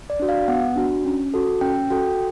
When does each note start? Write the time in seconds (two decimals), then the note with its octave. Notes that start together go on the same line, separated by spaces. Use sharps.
0.10 D5
0.20 D4 F#4
0.29 F5
0.48 B3 F#5
0.76 D4 F#4
1.05 C#4
1.34 F#4 A4
1.61 C#4 G5
1.90 F#4 A4 G5